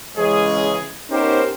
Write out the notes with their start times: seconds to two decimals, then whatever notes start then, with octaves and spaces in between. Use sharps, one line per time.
0.17 C#3 E3 G#3 C#4 G#4
1.10 B3 C#4 D#4 G4 A#4 C5